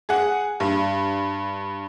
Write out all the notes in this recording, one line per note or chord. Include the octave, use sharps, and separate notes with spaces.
G#4 F#5
G2